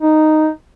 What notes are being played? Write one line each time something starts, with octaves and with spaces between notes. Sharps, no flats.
D#4